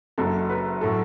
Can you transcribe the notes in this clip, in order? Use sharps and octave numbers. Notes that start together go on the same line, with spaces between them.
F#1 F#2 F#3 A4
B4
A2 F#3 A4